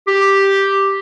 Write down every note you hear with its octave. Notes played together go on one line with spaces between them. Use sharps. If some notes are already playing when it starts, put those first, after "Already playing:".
G4